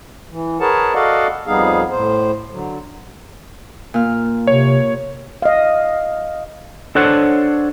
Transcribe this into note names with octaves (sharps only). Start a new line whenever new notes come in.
E3
G#4 A#4 B4 C#5 F#5 A5
F#4 A4 D5 D#5 F5 F#5
F2 G3 B3 D#4 G#4 F5
A2 C5
D3 F#3
A#2 F6
C3 C#5
D#5 F5
D4 A4 C5 C#5 F#5